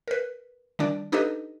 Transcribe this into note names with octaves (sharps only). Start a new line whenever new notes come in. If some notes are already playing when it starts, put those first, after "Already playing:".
A#4 B4
D#3 G3 D4 D5
D4 D#4 G4 A4 B4 D#5